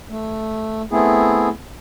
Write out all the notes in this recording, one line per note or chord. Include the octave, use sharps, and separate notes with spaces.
A3
A3 B3 C4 E4 G#4